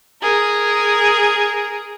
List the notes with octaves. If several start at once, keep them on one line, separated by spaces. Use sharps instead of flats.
G#4 A#4